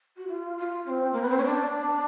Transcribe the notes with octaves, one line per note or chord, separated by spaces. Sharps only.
F#4
F4
F4
C#4
C4
A#3
B3
C4
C#4
D4